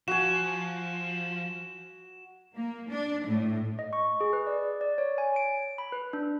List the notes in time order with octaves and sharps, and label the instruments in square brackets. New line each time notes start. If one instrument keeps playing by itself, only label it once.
[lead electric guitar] F3 [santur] F#4 G#5 [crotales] E7
[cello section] A#3
D4
A2
[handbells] D#5
C#6
G#4
B4
D5
D5
C#5
G#5
D7
B5
B4
D4